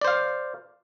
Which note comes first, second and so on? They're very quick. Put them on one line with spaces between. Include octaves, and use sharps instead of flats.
D5 C5 F5